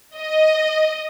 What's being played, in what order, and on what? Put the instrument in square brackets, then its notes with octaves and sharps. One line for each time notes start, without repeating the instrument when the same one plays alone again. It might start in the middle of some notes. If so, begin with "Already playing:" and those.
[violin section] D#5